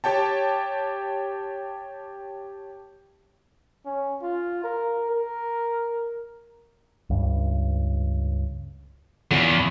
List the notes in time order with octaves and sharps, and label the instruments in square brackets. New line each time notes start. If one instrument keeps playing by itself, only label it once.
[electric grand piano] G4 C#5 G5 A5
[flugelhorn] C#4
F4
A#4
A#4
[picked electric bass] C#2 G2
[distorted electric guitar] E2 [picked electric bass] A#2 C#3